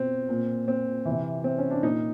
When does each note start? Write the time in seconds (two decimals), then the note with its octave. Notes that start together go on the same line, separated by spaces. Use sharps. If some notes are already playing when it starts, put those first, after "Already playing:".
Already playing: B2 C4
0.29 A#2
0.68 C4
1.05 E3
1.11 C3
1.44 C4
1.58 C#4
1.70 D4
1.83 A#2 D#4